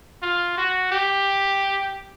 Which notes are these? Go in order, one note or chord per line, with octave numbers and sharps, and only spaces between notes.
F4
F#4
G4